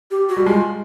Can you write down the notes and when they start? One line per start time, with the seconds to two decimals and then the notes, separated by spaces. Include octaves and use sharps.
0.11 G4
0.29 F#4
0.37 G3
0.46 G#3 F4